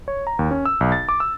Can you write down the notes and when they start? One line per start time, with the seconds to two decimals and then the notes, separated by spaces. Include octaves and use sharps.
0.08 C#5
0.27 A#5
0.39 D#2
0.51 C#4
0.65 E6
0.81 B1
0.92 A6
1.09 D6
1.20 E6